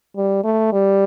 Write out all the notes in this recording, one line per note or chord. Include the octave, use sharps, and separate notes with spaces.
G3
A3
G3